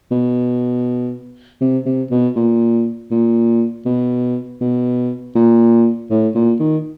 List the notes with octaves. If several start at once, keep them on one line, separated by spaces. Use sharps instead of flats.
B2
C3
C3
B2
A#2
A#2
B2
B2
A#2
A2
A#2
D#3